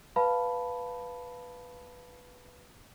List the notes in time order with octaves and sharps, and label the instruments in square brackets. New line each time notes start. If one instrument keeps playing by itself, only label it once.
[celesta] B4 F5 A5 B5